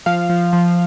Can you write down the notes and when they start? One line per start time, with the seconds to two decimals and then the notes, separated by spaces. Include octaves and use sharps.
0.06 F3 F5
0.30 F3
0.53 F3